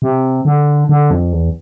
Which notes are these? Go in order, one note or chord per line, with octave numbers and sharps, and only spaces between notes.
C3
D3
D3
F2
E2